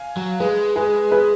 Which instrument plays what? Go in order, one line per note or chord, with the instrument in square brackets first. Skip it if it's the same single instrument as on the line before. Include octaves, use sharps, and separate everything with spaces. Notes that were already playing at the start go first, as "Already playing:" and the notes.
Already playing: [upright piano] F5 G#5
[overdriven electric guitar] F#3
[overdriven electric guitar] G#3 [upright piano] G#4 B4
[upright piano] G#4 B4
G#4 B4